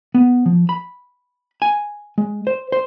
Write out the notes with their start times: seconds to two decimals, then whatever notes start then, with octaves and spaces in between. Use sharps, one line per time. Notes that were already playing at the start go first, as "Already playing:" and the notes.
0.14 B3
0.46 F3
0.69 B5
1.62 G#5
2.18 G#3
2.47 C5
2.72 C5